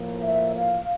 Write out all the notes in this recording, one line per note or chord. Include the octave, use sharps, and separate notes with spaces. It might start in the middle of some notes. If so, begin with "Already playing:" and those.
Already playing: A2 F3 A#3
E5
F5